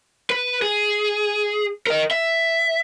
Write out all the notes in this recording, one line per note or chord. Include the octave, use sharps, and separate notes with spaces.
B4
G#4
A#4 D#5
E5